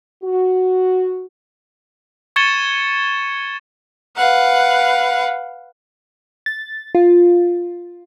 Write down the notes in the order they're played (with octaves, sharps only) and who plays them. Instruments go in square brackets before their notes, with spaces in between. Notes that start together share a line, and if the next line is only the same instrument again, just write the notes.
[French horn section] F#4
[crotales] C#6 G#6 A6 C#7 E7 G7
[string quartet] B4 F5 F#5
[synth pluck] A6
F4